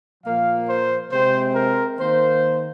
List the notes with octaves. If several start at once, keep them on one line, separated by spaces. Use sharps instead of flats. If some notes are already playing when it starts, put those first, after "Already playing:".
A#2 F3 A#3 F5
C5
C3 G#3 C4 C5
A#4
D#3 A#3 C5